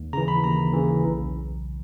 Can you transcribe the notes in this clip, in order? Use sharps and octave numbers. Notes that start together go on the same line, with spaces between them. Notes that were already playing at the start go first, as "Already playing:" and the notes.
Already playing: D#2
C#3 E3 A#5
B5
D#2 A#5
C#3 E3
B1